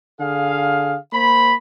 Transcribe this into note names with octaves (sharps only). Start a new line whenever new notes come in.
D3 G#4 F5
A#3 C5 B5